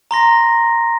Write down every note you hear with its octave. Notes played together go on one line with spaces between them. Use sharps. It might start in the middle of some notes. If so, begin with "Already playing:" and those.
A#5 C6 A#6